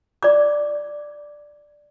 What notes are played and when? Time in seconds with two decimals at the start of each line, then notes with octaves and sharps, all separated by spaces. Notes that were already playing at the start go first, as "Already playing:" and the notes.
0.23 D5 D6